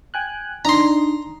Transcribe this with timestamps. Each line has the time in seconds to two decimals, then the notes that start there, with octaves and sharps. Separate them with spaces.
0.14 G5 G#5 F#6
0.65 D4 D#4 D#5 A#5 C6